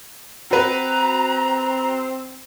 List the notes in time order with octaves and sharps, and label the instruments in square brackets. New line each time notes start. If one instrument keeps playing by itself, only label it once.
[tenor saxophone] C4 [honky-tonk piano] F#4 B4 [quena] A#5